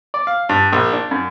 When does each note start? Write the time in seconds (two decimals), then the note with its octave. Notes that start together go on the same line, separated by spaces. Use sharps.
0.14 D5
0.27 F5
0.49 G2
0.72 A#1
0.93 D4
1.11 F#2